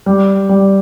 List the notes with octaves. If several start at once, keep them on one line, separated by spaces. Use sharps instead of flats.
G3
G3